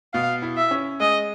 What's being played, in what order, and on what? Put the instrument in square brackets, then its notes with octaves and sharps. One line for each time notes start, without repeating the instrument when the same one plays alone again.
[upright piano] B2 [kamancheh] F5
[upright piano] E4
[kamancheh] E5
[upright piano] C#4
[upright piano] G#3 [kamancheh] D#5